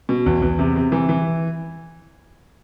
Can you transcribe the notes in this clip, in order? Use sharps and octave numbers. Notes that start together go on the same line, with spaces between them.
B2
E2
E2
C3
C3
E3
E3